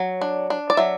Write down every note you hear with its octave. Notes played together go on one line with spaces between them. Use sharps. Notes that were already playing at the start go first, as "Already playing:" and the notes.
Already playing: F#3
D4
D4
D5
F#3 E5